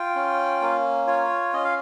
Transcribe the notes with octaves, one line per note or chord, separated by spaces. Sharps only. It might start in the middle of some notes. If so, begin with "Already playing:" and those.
Already playing: F4 G5
C#4
A#3
F4 C#5
C#4 D#5
F5